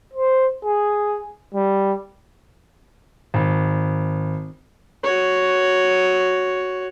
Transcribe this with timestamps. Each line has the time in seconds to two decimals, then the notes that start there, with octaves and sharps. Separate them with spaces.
0.13 C5
0.65 G#4
1.54 G3
3.34 G#1
5.04 F#4 C#5